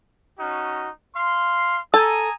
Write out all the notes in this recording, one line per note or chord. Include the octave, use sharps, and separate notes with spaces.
C#4 D#4 F#4
F5 C6
A4 G#5 A#5 D#6